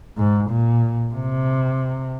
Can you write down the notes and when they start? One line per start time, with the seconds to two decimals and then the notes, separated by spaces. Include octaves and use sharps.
0.17 G#2
0.50 A#2
1.15 C3